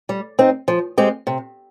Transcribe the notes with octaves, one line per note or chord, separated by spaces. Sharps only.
G3
C4 D#4
F3
G#3 C4 G4
C3